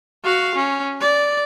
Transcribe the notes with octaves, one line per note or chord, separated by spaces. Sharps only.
F#4 F5
C#4
D5